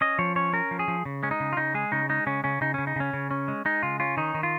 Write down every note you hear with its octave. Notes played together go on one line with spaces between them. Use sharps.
C#4 D#5
F3 C#5
C#4 C#5
C#4 A#4
F3
G#4
F3
C#3
G#3 C#4
D#4
C#3
F4
C#3 D#4
G#3 G#4
C#3 D#4
G#3 D#4
C#3 C#4
C#3 C#4
C#3 D#4
C#3 C#4
D#4
C#3 C#4
C#3
C#4
G#3
G#3 D#4
C#3 F4
C#4 F4
D#3 D#4
D#3
F4